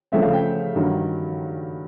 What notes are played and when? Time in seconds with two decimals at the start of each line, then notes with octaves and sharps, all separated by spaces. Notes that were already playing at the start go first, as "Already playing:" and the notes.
0.12 C#3 F3 A3 C4 E5
0.22 F5
0.33 G5
0.76 G2 D#3 F#3 A#3